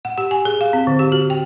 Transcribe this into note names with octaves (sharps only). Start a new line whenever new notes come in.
F#5
G4
G#5
G#4
F5
C4
D3
G4
F#4
G5